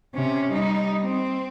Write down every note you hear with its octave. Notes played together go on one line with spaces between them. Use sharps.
C3 C#4
G3 D#4
C4